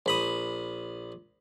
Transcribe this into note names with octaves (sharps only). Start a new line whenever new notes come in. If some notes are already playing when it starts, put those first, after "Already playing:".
A#1 B5 D#6